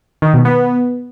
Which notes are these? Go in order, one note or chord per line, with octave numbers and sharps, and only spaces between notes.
D#3
B2
B3